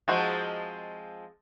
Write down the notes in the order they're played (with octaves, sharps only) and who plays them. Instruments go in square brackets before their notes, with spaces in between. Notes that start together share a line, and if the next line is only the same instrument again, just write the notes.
[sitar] F3 G#3 C4 [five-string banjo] D#4 F#4 C5